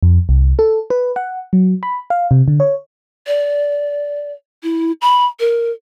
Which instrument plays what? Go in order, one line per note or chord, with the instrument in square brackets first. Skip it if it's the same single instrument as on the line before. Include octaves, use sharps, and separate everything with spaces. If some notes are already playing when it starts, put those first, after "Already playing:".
[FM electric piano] F2
C2
A4
B4
F#5
F#3
B5
F5
C3
D3
C#5
[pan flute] D5
E4
B5
A#4